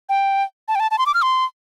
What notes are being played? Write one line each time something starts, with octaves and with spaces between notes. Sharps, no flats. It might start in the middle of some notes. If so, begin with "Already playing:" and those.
G5
A5
G5
A5
A5
C6
D6
F6
C6